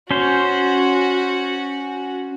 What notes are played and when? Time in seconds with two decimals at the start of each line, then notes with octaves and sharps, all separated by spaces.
0.11 C#4 F#4 C5